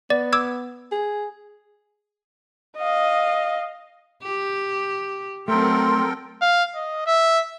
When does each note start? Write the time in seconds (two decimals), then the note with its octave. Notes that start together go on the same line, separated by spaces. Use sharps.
0.10 B3 D5
0.33 D6 E6 G#6
0.91 G#4
2.77 D#5 F5
4.23 G4
5.48 F#3 A3 C4 A4 A#4 G5 C6
6.41 F5
6.75 D#5
7.06 E5